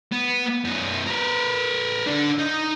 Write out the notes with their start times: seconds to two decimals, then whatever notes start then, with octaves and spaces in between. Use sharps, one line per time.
0.12 B3
0.64 F#2 B3
1.06 A#4 B4
2.07 D3 D4
2.39 D#4